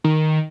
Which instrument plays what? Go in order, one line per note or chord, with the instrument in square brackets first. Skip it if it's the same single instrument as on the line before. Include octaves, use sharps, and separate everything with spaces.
[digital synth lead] D#3